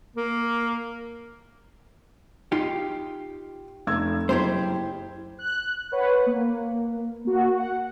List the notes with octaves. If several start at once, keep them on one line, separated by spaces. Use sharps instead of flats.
A#3
D#4 F4 G4 C7
F1 E6 G#6
F#1 E4 G4 C5 G#6
F#6
B4 C#5 F#5
A#3
A#3 F#4
F#5